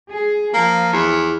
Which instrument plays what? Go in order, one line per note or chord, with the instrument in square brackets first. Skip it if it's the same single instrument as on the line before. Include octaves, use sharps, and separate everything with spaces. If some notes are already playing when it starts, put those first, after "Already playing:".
[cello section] G#4
[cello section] F3 [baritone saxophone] A#3
[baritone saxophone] E2